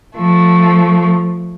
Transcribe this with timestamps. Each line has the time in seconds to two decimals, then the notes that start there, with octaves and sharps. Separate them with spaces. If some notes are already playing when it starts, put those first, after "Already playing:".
0.16 F3 A3